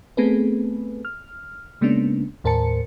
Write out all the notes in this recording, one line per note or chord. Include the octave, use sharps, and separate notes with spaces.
A3 B3 C4 G#4 A4 B4
F6
C#3 G#3 A#3 B3 C#4 D4
D#2 A2 A#4 C5 A5 C#7